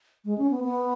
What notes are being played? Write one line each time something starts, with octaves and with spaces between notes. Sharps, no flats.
G#3
C#4
B3
B3